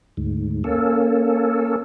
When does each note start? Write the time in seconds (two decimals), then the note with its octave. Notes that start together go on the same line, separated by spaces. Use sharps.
0.17 D2 G#2
0.64 A#3 C#4 A4